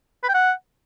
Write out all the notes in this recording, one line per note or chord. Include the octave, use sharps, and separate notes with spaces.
B4
G5
F#5